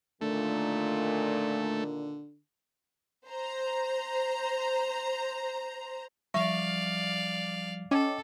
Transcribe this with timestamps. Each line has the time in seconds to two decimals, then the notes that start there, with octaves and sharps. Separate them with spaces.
0.21 A#2 D3 D#3 A3
3.27 C5 A#5
6.34 F3 G3 D5 E5 F5 C#6
7.91 C#4 A4 D#5 G5 D6